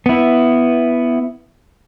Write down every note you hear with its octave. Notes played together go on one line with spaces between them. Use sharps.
B3 E4